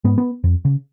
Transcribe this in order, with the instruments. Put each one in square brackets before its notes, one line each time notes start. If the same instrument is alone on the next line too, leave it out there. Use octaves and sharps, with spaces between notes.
[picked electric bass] G#2 B3
B3
F2
C#3